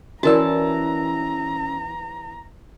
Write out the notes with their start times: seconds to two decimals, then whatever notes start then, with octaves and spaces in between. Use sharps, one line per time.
0.23 E3 C#4 F#4 A#4 D5 A5 A#5 E6